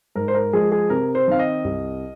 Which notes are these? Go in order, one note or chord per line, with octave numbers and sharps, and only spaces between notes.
G#2 A#4
C5
A#4
F3 G#3 G#4
G#4
C3 A#4
C5
D#3 C4 F5
D#5
C2